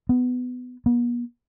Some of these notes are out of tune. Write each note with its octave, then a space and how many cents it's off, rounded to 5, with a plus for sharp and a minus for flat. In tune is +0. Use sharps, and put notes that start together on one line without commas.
B3 +15
B3 -45